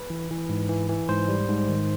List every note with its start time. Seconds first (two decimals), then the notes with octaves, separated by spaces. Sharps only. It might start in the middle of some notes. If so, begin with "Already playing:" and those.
Already playing: B4
0.10 E3
0.30 E3
0.49 G#2
0.69 E3
0.89 E3
1.09 G#2 C5
1.28 G3
1.48 G#2
1.68 D#3